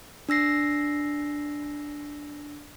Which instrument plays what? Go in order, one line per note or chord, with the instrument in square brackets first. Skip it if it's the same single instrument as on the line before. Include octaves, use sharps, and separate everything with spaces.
[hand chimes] D4 E6 A#6 C7